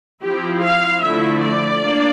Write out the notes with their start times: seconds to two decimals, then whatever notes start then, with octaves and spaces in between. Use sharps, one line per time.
0.22 F3 C4 E4 G4
0.63 F5
1.02 D3 F3 A3 E4 E5
1.42 D5
1.81 A#3 D4